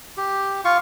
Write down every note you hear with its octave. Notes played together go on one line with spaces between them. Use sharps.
G4
F4 F5 C#6